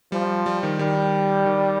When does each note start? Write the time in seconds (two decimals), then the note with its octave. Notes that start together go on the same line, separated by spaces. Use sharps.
0.12 F3 G3
0.46 G3
0.63 D#3
0.79 D#3 G3
1.46 D#3